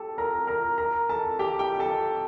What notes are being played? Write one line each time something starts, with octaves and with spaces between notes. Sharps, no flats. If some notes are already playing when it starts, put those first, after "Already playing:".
Already playing: G4 A4 A5
A#4 A#5
A#4 A#5
A#4 A#5
A4 A5
G4 G5
G4 G5
A4 A5